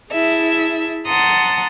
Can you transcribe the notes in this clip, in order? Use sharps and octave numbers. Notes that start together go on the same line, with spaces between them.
E4 G#4 E5 A5
F#5 A5 A#5 C6 D#6